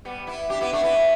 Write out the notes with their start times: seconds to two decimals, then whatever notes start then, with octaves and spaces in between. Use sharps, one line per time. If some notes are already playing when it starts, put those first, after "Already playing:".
0.05 G3 B3
0.27 B3 E4
0.49 D4 G4
0.61 B3 E4
0.72 A3 D4
0.83 B3 E4